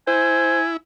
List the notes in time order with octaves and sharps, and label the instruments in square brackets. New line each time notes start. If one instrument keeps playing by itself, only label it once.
[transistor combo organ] E4 [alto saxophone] C5 [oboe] G#5